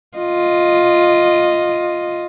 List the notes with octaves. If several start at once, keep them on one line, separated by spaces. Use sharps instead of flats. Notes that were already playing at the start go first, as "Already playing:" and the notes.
F4 D#5